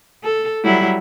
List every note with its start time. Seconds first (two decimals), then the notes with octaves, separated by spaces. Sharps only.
0.24 A4
0.64 F#3 G3 E4